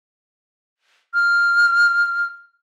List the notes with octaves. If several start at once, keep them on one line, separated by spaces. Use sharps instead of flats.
F6